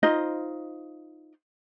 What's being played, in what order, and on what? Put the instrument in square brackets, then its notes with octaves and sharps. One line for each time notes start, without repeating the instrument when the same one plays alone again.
[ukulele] D#4 F4 C5 D#5